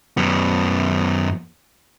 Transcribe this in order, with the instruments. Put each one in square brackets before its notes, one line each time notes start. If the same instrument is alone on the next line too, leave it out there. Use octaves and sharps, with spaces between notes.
[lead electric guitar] F#2 B3